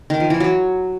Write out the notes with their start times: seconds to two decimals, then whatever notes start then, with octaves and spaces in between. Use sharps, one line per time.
0.10 D#3
0.20 F3
0.30 E3
0.40 F#3